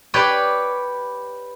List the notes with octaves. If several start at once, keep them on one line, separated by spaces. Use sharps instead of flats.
G4 B4 C#5 D5 G5